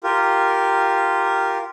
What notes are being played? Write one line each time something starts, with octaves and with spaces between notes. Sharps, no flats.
F4 G4 A#4